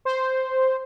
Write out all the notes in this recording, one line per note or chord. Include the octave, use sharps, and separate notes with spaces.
C5